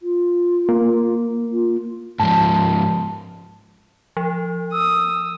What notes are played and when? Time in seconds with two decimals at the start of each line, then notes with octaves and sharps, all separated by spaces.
0.01 F4
0.69 A#3
1.51 F4
2.20 G#2 F3 A5
4.17 F3
4.73 D#6 E6